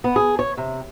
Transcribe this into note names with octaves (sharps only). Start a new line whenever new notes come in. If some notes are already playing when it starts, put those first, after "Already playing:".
B3
G#4
C#5
C3